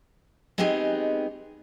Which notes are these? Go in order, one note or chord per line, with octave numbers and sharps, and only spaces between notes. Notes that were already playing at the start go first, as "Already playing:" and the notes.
G#3 B3 C4 D#4 G4 G#4